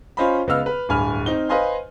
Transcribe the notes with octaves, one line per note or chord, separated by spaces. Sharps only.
C#4 F4 C5 D#5 F5 B5
C#2 B3 D#5 F5 E6 F6
B4
D1 G2 G#5 B5 F6
C4 D#4 G7
B4 C5 D#5 F5 G#5 C6